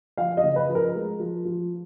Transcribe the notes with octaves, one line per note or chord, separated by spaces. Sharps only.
F3 F5
D#5
C#3
B4
F3
A#4
G#3
F3
F3